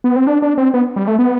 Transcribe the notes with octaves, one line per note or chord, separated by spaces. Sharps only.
B3
C4
D4
D4
C4
B3
G3
A3
B3